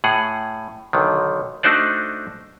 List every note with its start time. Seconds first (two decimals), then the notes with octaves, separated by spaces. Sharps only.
0.04 A2 G#4 F#5
0.93 B1 D3 D#3
1.63 A3 D4 D#4 F#4 C5 D5